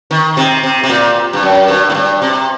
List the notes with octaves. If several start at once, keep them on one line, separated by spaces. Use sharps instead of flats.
D#3
C3
C3
C3
A#2
G2
F#2
G2
A2
G2
C3